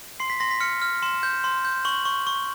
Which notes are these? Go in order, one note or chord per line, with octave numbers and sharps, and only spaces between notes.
C6 C7
B6
C6 A#6
B6
F6 C#7
F6
C6 E7
G6
C6
G6
C#6 F#7
C#6
C#6